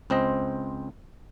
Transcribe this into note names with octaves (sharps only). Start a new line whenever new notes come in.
C#2 C4 C5 D#5